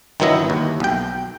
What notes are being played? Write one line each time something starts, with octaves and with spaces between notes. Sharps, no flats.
G1 D#3 F#3 B3 E4 D#5
D#2
B1 G5